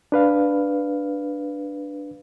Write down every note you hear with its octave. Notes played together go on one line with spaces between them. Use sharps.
D4 B4 F5